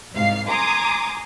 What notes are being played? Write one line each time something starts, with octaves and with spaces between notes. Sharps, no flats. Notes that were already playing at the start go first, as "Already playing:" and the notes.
C2 G#2 F5 C7
G#5 A#5 C6 D6 D#6